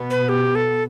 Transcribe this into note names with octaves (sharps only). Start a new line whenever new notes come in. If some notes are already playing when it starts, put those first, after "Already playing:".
Already playing: B2 B3
B4
G4
A4